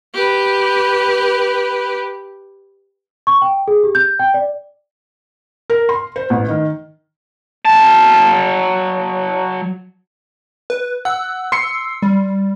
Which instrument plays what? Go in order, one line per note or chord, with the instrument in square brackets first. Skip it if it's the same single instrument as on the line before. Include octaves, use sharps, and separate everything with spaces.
[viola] G4 B4
[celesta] C#6
G5
G#4
G4
G6
G5
D5
[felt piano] A#4
C6
C5
A1
D#3
[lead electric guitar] F#3 A5
[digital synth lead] B4
[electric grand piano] F#5 [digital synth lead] E6
[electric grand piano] C6 C7 C#7
[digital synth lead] G3